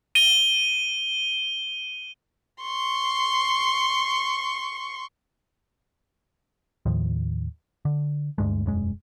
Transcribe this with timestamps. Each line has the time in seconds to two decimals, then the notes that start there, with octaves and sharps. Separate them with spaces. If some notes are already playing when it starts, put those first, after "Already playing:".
0.15 D#7 G7
2.62 C6 C#6
6.86 D#2 A2 D#3 F3
7.85 D3
8.38 D2 G2 G#3
8.66 E1 F#2 G#3